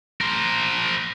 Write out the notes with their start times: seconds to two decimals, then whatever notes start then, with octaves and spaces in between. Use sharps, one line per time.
0.21 A#4 C5